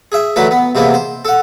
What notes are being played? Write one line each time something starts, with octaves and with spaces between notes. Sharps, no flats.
G#4 E5
D3 E3 F#3 A3 B4
B3
C3 E3 G#3 A#3 B3
C5
A4 F#5